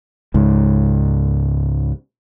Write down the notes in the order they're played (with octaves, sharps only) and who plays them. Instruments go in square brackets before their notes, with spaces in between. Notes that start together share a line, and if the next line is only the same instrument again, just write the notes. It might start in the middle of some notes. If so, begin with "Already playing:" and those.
[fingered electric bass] C#2 G#2